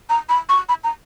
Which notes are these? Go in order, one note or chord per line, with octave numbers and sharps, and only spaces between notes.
A#5
B5
C#6
B5
A#5